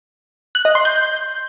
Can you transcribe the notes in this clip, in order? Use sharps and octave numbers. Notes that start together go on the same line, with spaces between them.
F#6
D#5
C6
G6